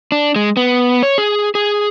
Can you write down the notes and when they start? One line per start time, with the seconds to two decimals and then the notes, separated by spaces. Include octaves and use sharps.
0.12 D4
0.36 G#3
0.57 B3
1.03 C#5
1.18 G#4
1.55 G#4